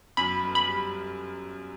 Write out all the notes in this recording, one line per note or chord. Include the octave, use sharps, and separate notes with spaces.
F#2 B5
G1
B5
G3